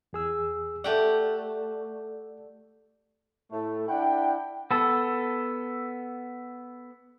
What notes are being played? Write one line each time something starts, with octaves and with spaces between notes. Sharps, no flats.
E2 G#4 E6
A3 G4 D5 F#5
A2 A3
D4 E4 F#5 G5
B3 A4